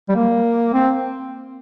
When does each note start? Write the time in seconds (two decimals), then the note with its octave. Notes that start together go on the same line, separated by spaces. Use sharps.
0.09 G3
0.16 A#3
0.74 C4